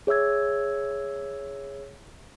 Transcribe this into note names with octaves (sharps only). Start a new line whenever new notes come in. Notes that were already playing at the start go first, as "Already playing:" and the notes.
G#4 C#5 E5 E6 G#6